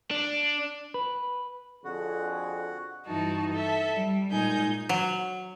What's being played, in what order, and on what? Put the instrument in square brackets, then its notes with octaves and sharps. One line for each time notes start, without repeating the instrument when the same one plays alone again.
[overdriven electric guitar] D4
[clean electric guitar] B4
[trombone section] F2 D3 G#4 [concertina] F#4
[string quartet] G2 E3 D#4 F#4 A5
A4 E5
G3
A#2 G#3 D#4 G#5 G6
[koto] F#3